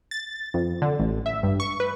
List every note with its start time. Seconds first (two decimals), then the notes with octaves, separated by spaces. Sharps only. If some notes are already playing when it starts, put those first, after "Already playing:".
0.11 A6
0.54 F2
0.82 D3
0.99 A1
1.26 E5
1.43 G2
1.60 C#6
1.80 B4